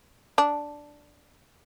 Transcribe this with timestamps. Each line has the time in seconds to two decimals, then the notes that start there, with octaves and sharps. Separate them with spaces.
0.38 D4